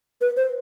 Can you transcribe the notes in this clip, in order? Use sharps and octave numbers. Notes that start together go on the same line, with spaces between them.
B4
C5